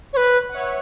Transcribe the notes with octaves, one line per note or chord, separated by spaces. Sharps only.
C#5
B4
F#5
C#5 E5